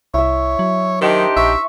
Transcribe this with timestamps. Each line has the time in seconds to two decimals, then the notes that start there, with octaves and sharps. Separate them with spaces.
0.14 C2 E4 C#5 E5
0.59 F#3
1.01 D#3 D4 D#4 G4 C5
1.37 A#1 E5 C#6